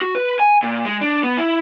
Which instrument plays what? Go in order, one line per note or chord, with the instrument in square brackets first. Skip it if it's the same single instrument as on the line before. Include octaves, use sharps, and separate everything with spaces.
[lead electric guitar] F#4
B4
G#5
A#2
G#3
D4
B3
E4